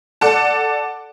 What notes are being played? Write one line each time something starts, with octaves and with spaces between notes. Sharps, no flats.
A4 D5 F#5 A5